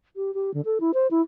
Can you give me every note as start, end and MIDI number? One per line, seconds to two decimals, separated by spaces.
0.16 0.33 67
0.34 0.53 67
0.54 0.61 50
0.65 0.78 69
0.80 0.91 64
0.94 1.07 72
1.11 1.21 64